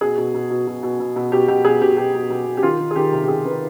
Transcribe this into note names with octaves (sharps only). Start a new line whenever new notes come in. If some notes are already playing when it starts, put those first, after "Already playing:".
B2 G#4
B2
B2
B2
B2
B2
B2
B2
B2 G4
B2 G4
B2 G#4
B2 G4
B2 G4
B2
B2
B2
G4
D#3 F4
D#3
G#4
D#3 G4
C3
G4
C3 G#4
D#3 B4